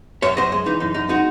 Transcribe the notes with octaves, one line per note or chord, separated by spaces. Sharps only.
F#2 C#5 E5
F#2 C5 D#5
G#3
E3 D#4
F#2 D#4
F#2 D#4
G#3 D#4 F#4